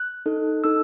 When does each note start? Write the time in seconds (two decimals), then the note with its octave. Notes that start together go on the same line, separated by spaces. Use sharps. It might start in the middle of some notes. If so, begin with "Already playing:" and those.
Already playing: F#6
0.26 D#4 A4
0.64 D#4 A4 E6